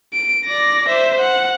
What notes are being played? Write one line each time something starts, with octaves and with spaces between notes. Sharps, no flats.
D7
D5 A#6
C5 E5
F#5